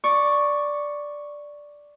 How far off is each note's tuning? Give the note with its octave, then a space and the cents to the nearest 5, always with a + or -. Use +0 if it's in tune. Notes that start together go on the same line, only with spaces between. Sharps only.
D5 +0 C#6 +0